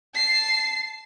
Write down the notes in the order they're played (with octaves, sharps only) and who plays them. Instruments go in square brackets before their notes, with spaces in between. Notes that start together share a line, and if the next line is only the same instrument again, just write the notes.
[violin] A5 C7